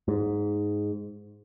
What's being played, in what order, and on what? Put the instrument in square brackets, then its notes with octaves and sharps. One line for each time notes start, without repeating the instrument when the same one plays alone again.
[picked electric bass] G#2